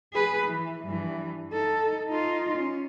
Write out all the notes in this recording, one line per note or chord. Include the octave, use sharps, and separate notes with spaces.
G#4 B4
E3
G2 E3
D#4 A4
D#4 F4
C#4